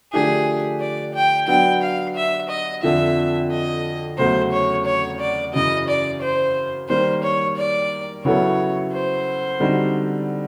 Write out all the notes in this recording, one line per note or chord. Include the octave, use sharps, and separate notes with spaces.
D3 F3 A3 D4 G4 G#4
D5
G5
F#3 B3 D4 G5
F5
E5
D#5
F2 D3 F3 E5
D#5
E2 C#3 F#3 A3 C5
C#5
C#5
D5
F#2 C#3 E3 D#5
D5
C5
D#3 G3 A#3 C5
C#5
D5
C#3 F#3 B3 E4 A4 C#5
C5
D3 G3 C4 D#4 F#4